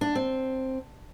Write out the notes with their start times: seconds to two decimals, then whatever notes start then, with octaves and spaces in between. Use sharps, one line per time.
0.01 D4
0.15 C4